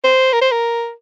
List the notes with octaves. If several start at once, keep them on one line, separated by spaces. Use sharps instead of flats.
C5
A#4
C5
A#4